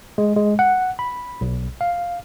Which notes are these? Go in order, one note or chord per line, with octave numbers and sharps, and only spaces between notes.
G#3
G#3
F#5
B5
B1
F5